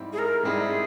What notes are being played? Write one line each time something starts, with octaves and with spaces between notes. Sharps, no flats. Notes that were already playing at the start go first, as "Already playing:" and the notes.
Already playing: G#2 G3 C4 E4
G#4
A#4
G#2 G3 C4 E4 G#4